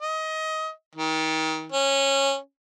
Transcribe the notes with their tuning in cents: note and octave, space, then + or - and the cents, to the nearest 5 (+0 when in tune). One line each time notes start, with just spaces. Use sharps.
D#5 +20
D#3 +30
C#4 -15